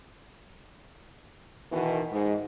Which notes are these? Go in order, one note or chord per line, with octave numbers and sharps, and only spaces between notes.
B2 D#3 E3
G#2